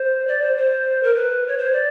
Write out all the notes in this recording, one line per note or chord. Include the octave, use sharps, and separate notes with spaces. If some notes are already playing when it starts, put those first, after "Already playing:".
Already playing: C5
D5
C5
C5
A#4
B4
C#5
C5
D5